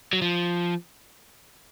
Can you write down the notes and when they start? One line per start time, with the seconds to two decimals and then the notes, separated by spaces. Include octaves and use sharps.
0.13 F#3
0.22 F3